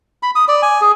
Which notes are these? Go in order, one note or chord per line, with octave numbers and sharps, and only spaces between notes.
B5
D#6
D5
G#5
G#4